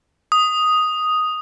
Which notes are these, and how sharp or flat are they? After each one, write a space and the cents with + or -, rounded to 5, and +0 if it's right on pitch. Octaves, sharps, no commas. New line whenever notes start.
D#6 +0